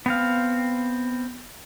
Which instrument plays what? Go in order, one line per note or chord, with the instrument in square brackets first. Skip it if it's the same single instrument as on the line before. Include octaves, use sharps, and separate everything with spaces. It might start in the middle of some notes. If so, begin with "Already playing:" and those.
[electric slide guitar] B3 C4 F5